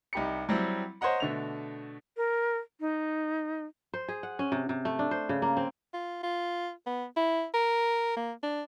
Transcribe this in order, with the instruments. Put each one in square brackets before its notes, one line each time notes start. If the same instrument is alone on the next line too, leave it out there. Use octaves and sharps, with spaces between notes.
[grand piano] C2 D#4 G4 B5 C#7
F#3 G3 C4 E4
C5 C#5 D#5 F#5 A#5
B2 D3 A3 F7
[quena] A#4
D#4
[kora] C5
G#4
F#5
C#4
C3
C3
A3
D4
C5
C#3
A#3
C4
[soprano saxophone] F4
F4
B3
E4
A#4
A#3
D4